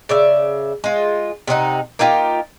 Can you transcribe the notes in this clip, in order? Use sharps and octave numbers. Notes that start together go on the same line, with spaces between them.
C#3 D5 E5
G#3 F4
C3 D4 D#4 F#5
A#3 D#4 F4 G4